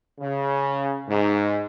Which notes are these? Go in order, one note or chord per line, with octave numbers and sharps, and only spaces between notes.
C#3
G#2